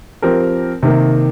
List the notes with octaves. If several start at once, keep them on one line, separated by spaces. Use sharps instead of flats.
F3 C4 G4 A#4
C3 D#3 A#3